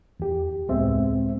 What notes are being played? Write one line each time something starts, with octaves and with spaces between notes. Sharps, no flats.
E2 G4
C#2 A2 G#3 B3 C4 E5